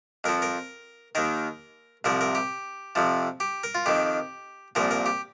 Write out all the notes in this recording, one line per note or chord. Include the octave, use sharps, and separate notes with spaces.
F2 F3 A#4
A#4
D#2 D#3 A#4
C2 C3 F3 A#4
A#4
G4
F2 C3 F3
G4
A#4
F4
F2 D#3 G4
C2 A#2 F3 A#4
A#4
G4